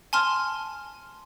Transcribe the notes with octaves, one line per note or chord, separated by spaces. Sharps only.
G#5 A5 C6 F6